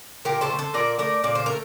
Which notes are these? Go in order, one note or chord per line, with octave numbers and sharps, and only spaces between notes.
A#2 G4 A#4
A4 C5
A3
A4 C5
A#2 A#4 D5
A3 A#4 D5
A#2 D5
C5
A3 A#4